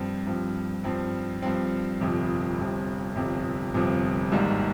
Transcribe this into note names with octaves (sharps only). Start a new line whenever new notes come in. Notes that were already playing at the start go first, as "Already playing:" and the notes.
Already playing: G2 F3 C4
G2 F3 C4
G2 F3 C4
G2 F3 C4
G1 F2 C3 F3
G1 F2 C3 F3
G1 F2 C3 F3
G1 F2 C3 F3
G#1 G#2 G3 A#3